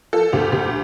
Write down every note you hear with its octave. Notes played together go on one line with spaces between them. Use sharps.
F3 A4
D2 G4
D2 G4